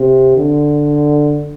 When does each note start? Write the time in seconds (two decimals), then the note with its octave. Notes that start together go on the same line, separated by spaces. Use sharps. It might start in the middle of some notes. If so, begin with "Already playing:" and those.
Already playing: C3
0.37 D3